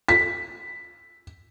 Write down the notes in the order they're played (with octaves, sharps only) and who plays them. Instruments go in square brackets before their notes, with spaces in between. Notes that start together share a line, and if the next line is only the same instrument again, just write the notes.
[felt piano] B6